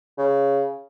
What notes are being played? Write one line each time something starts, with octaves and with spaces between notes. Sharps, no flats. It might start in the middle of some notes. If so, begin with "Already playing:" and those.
C#3